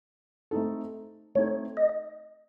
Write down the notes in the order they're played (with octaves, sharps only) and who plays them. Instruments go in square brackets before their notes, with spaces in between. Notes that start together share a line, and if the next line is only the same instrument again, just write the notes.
[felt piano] A3 C4 D#4 A4
[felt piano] A3 C4 D#4 A4 [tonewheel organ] C#5
[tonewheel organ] D#5